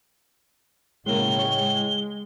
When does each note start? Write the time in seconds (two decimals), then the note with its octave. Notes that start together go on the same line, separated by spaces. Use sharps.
1.06 A2 C#3 F#3 G#3 A#3 G7
1.39 G#3 C#5